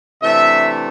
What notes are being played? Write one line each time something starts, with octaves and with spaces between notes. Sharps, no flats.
C3 E3 A3 D4 E5